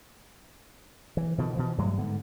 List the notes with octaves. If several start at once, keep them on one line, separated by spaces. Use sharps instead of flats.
E3
B2 D3 D#3 F3
B2 E3 F3
G2 F#3 G3 A3
G#2 D3 B3